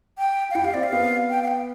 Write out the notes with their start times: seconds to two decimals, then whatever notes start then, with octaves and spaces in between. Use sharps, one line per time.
0.18 G5
0.50 F5
0.55 E4 G5
0.64 G4 F5
0.74 C4 D5
0.83 F5
0.93 B3
1.30 G5
1.43 F5
1.48 G5